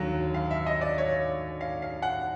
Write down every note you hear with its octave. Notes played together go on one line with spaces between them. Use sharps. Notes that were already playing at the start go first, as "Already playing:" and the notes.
Already playing: D#2 D3 F#3
F5
E5
D#5
D5
C#5
F5
F5
F#5